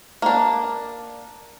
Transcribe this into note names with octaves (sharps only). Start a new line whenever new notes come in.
A#3 D4